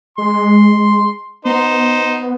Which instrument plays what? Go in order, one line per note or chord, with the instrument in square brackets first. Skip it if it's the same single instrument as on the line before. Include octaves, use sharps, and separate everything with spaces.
[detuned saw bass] G#3 [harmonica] C6
[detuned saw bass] B3 [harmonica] D#4 C5